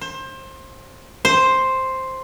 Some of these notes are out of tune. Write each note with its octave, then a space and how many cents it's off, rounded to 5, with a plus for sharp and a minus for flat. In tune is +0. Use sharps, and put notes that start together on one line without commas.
C5 +25
C5 +5